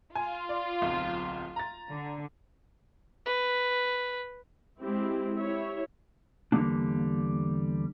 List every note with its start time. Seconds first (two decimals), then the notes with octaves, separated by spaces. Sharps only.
0.15 F4 G#5
0.49 D5
0.81 D1 B1 C4
1.56 A#5 A6
1.91 D3
3.26 B4
4.80 G#3 C4 E4 G4
5.37 E4 G4 C#5 E5
6.52 E2 D3 G3 G#3 A#3 D4